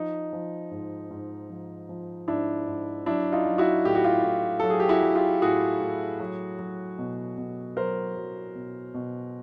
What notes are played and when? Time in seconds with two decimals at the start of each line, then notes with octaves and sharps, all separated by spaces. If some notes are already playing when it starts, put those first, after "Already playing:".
Already playing: F3 D#4
0.33 F3
0.71 G#2
1.11 G#2
1.50 F3
1.89 F3
2.28 G#2 D4 E4
2.67 G#2
3.06 F#3 D4 E4
3.32 D#4 F4
3.46 F#3
3.58 E4 F#4
3.85 A2 G4
3.95 F#4
4.04 F4 G4
4.24 A2
4.60 F#3 A4
4.70 G#4
4.80 G4
4.89 E4 F#4
5.03 F#3
5.15 F4 G4
5.42 A2 F#4 G#4
5.81 A2
6.20 F#3
6.59 F#3
6.98 B2
7.38 B2
7.77 F#3 A#4 C5
8.16 F#3
8.55 B2
8.94 B2